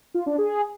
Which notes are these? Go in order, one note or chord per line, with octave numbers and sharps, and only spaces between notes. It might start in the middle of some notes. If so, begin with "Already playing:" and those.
F4
D4
G#4